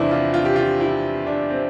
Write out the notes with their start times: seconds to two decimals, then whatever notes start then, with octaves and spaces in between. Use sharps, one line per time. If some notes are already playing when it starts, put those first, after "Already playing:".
Already playing: E2 C3 E3 C4 D4 E4
0.11 F4
0.34 F4
0.45 G4
0.56 F4
0.81 E4
1.27 D4
1.50 C4